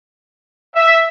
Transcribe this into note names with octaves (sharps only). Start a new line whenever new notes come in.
E5